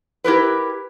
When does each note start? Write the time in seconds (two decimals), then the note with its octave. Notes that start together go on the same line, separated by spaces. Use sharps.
0.24 E4 G4 A#4 B4